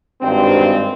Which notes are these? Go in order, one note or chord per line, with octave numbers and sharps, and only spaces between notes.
G#1 G2 C4